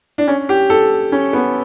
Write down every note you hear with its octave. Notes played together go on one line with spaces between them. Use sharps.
D4
C#4
G4
A4
C#4
B3